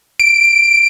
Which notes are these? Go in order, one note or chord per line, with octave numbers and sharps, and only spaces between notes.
D7